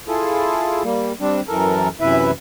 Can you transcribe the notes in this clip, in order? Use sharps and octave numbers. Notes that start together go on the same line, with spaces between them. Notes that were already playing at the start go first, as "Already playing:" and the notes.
E4 F4 G#4 A4
G3 A#3
G3 C4 D4
F#2 E3 A4 A#4
F#2 C3 E3 E4 B4 E5